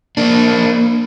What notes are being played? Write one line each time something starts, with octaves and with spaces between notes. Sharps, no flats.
A#3 D4